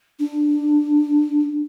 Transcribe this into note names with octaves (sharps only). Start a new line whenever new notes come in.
D4